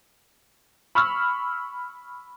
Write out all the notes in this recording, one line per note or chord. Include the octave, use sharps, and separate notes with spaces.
B5 C#6 E6 F6